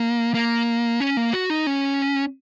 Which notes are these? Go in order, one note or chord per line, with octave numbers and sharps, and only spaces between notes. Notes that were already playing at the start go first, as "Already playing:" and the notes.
Already playing: A#3
A#3
C#4
A#3
F#4
D#4
C#4